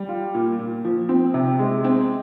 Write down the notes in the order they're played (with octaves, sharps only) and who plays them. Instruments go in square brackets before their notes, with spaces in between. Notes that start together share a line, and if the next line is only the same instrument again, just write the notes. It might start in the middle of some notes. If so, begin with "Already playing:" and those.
Already playing: [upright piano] G3
F4
A#2
A#2
F3
C4
C3
G#3
C4